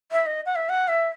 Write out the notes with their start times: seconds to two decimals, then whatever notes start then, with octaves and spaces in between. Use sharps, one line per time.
0.12 E5
0.26 D#5
0.46 F#5
0.56 E5
0.69 F#5
0.88 E5